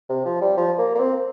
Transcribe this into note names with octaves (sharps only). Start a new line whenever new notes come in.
C3
F3
G3
F3
A#3
A#3
C4